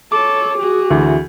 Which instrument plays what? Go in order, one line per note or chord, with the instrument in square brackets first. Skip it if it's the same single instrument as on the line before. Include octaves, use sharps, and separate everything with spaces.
[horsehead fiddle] A4 C#5 [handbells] D6
[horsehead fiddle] F#4 G#4
[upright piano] D2 E3